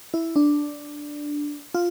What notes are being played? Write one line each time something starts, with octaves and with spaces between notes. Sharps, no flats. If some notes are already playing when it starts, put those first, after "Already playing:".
E4
D4
F4